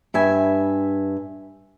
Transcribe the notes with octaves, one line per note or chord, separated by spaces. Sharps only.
G2 E5 G#5